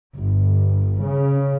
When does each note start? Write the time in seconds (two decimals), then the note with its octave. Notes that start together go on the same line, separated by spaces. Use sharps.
0.16 G1
1.04 C#3